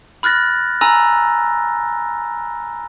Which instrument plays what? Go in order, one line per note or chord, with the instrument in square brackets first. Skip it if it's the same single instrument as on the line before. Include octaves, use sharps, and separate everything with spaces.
[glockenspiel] B5 F6 F#6 A6 A#6
G#5 A#5 B5 E6 A#6